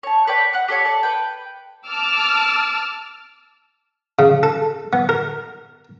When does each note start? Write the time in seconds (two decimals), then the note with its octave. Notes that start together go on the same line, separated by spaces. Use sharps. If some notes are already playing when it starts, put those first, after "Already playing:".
0.03 C#5 A5
0.27 B4 C#5 D5 G5
0.53 F#5 F#6
0.68 G4 A4 C#5 F5
0.85 D5 A5
1.03 B4 G5
1.88 A5 D6 E6 F6
4.19 C#3
4.43 A4
4.93 B3
5.09 A#4